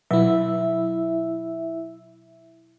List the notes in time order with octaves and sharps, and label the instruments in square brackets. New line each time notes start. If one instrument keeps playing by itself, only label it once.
[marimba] B2 F#3 [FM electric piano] E4 E5